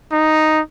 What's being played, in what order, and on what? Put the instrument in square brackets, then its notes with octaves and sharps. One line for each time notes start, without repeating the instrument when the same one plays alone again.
[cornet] D#4